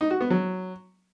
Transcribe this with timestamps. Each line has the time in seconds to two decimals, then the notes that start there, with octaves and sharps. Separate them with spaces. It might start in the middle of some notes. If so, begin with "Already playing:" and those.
0.01 D#4
0.11 F#4
0.21 B3
0.30 F#3